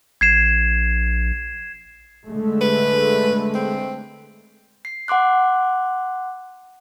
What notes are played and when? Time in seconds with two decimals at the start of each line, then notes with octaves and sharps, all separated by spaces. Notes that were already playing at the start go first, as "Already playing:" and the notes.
0.21 A#1 G#6 C7 E7
2.27 D3 G#3 A3
2.61 B4
3.55 C4
4.85 C7
5.08 F#5 C6 D6 F#6